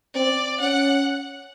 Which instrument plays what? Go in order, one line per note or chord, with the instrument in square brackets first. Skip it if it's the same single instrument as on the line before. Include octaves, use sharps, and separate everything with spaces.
[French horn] C4 [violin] D5
[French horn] C#4 [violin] F#5